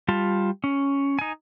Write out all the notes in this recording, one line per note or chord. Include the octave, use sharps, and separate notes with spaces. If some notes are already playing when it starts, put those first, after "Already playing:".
G3 F4 A5
C#4
D#4 G#5